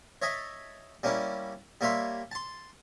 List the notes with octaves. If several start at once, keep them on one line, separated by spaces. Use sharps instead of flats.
C#5 D#5 E5 A5
G3 A#3 C#4 E4
G3 A#3 C#5 E5 C6
A5 C6